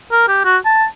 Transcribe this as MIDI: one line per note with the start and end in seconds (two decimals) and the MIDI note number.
0.12 0.25 70
0.28 0.41 67
0.45 0.58 66
0.65 0.86 81